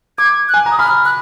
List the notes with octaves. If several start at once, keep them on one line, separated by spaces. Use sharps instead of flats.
D6 G#6
F#6
G#5
A#5
D#6
B5 F6
F#6